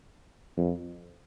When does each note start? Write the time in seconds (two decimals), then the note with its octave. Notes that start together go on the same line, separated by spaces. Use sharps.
0.57 F2